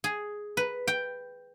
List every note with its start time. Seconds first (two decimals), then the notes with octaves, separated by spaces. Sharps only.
0.04 G#4
0.57 B4
0.87 G5